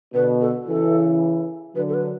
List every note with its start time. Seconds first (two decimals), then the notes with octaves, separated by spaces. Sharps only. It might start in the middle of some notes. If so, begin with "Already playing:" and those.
0.14 B2 D3 B4
0.41 A4
0.67 C#3 E3 A4
1.75 D3 F#3 B4
1.89 A4
1.94 B4